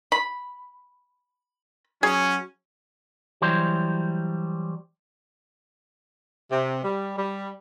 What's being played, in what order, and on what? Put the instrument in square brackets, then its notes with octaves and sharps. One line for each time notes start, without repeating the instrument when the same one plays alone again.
[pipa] B5
[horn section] F#3 C#4 [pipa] G#4
[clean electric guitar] E3 F#3 G3 C5
[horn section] C3
G3
G3